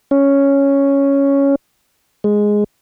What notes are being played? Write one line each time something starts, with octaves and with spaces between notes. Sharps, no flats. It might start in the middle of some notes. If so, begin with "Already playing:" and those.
C#4
G#3